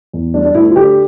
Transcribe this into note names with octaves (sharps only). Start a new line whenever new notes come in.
E2
G3 D4
D4
D2 E4
F4
D3 G4